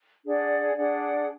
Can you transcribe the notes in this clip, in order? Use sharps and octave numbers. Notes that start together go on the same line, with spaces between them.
D4 G#4 D5 F#5
D4 G#4 D5 F#5